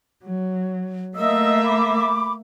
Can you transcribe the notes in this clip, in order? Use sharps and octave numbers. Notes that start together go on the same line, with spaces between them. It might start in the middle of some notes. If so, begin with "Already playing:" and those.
F#3
A3 A#3 D#5 E5 D#6 E6
B5 D6